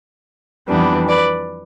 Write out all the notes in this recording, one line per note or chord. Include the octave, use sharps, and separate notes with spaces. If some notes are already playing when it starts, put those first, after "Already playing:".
F2 E3 G3 B3 D4
B4 D5